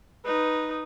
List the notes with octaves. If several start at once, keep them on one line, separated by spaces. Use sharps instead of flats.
D#4 B4